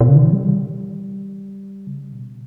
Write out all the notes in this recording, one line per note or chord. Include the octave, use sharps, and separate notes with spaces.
B2
C#3
D#3
E3
G3
C#3
B2